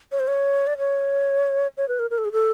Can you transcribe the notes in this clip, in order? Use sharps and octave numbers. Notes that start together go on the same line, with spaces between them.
C#5
C5
C#5
D5
C#5
C#5
B4
A#4
A#4
A4
G#4
A4